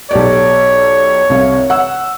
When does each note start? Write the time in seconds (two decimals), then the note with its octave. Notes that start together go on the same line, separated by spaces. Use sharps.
0.11 B1 G4 C#5 D5
1.30 C2 C3 F5
1.70 F#5 E6